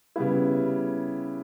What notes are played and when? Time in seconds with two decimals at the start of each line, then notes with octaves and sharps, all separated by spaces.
0.16 C#3 G3 B3 E4